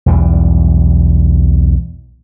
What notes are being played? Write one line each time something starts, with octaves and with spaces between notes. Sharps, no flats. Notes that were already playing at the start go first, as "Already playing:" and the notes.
B1 E2 G3